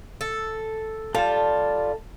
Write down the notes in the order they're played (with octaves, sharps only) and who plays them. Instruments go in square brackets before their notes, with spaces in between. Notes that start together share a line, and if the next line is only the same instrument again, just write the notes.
[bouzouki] A4
[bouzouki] G3 F4 [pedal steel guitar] A4 A5